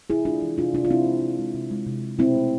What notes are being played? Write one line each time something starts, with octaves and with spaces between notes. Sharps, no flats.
C3 E4 G#4
G#3 D4 F4
E3
C3 D4 F4
C3 D4 F4
F4
C3 C4 E4
G#3
C3
G#3
C3
G#3
C3
G#3
B2 C4 E4
A3